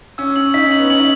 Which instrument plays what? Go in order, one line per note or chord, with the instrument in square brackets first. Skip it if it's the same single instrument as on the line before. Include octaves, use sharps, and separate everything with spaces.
[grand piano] C#4 [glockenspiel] E6
[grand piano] C#4 [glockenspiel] F#7
[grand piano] D#4 [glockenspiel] B6
[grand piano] C#4
[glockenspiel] F#7
[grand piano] B3
[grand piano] C#4 [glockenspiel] F#7
[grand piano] D#4